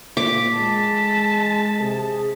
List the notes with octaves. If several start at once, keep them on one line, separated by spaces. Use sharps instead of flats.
A#2 D6 B6
G#3 A5
C3 G#4